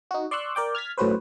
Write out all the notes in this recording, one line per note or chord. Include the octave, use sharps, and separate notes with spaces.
D#4 F#4
D5 C6 C#6 E6 F#6
A#4 D5 G5 D6
F6 G#6 A6 B6
A2 F#3 C#4 F#4 B4 C5